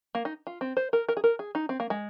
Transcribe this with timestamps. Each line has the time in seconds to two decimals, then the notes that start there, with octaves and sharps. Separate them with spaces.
0.15 A#3
0.25 D#4
0.47 F4
0.61 C4
0.77 C5
0.93 A#4
1.09 A#4
1.17 G#4
1.24 A#4
1.39 G#4
1.55 D#4
1.69 C4
1.80 A#3
1.90 G#3